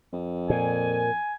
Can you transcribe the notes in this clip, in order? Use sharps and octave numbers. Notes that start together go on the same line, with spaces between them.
F2
A#2 G#5